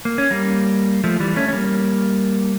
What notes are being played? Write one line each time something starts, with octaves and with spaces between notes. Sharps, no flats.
A#3
C#4
G3 A#3
F3 A3
E3 G3
A3 C#4
C#4
G3 A#3